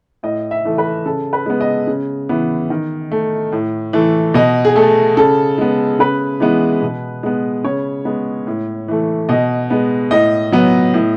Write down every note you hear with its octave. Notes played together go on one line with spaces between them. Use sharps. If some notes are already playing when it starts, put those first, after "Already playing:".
A2 D#5
E5
E3 A3
B4
C#3 A4
B4
G#3 B3
D#5
C#3
E3 B3
D#3
A3
A2
E3 A3
B2 D#5
G#4
A3 A4
C#3 A4
G#3 B3
C#3 B4
E3 G#3 B3
B2
G#3 B3
C#3 C#5
G#3 B3
A2
E3 A3
B2 D#5
G#3 B3
A2 D#5
F#3 B3
A2